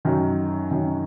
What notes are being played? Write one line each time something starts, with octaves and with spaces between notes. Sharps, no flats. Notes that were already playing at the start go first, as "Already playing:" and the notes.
F#2 D#3 F#3
F#2 D#3